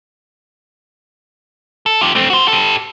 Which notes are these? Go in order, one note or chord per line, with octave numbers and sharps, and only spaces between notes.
A4
F4 G4
A3 C4
F#4 C5
G4 A4